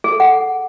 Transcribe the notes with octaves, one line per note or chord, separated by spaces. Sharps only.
G#4
A4
F#5